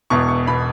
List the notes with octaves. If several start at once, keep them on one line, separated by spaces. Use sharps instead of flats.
E1 E2 B2 C#6
C#6
B2 B5